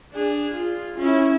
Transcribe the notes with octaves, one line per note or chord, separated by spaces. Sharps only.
D4 G#4
F4
C#4 E4